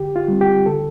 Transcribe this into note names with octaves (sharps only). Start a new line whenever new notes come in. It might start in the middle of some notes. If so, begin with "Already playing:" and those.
Already playing: D3 G4
F4
G3 C4
G4
D3 A4